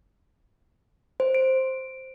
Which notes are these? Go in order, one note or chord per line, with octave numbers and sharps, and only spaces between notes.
C5
D7